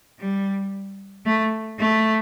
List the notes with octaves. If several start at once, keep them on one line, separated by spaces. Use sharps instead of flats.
G3
A3
A3